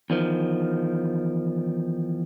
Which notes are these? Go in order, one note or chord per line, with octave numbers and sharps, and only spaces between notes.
E2 D#3 F3